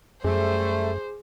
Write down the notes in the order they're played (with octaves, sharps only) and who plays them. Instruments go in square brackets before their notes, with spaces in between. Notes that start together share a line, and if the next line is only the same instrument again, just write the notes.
[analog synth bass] F#2 [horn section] G3 A3 [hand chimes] G#4 [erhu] C5